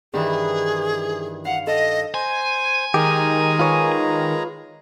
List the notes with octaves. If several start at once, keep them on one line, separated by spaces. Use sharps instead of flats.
G2 D#3 E3 G#4
F5 F#5
A4 D#5 D#6
C5 G#5
D#3 G#3 G4 G#4 A#5
F4 B4 C#5